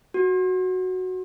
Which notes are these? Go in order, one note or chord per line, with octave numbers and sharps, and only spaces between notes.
F#4